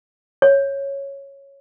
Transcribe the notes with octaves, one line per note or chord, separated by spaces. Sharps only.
C#5